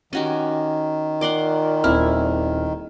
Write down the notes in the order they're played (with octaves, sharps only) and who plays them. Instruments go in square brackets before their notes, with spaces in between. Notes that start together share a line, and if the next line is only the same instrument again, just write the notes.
[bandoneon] D#3 [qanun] C#4 F#4 G4
[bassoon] A#2 [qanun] F#5 C6 D6
[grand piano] D#1 C4 F6 [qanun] E4